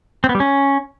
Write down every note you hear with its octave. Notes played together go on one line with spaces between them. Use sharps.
C4
B3
G3
C#4